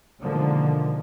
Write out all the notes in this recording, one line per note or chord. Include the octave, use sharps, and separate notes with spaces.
B2 D3 D#3 F3 G#3 A#3